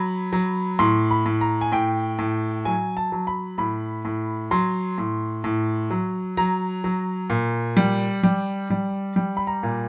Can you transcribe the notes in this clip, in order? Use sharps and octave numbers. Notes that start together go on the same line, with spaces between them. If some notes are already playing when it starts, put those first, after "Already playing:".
Already playing: F#3 B5
F#3
A2 C6
B5
A2
A#5
G#5
A2 G5
A2
F#3 G#5
A5
F#3
B5
A2 B5
A2
F#3 C6
A2
A2
F#3
F#3 A#5
F#3
A#2
G3
G3
G3
G3
B5
A#5
A#2